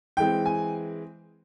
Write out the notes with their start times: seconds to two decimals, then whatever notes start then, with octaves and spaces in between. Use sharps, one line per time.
0.17 E3 G#3 C4 G5
0.46 G#5